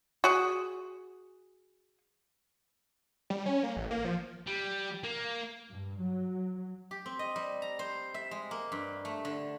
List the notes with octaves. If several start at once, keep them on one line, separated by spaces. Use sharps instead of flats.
F#4 G#4
G3
C#4
A#3
A1
A#3
F3
G3
A#3
G2
F#3
G4
C4
D#5
G3
A#5
C5
E5
G#3
A#3
G2
A3
D3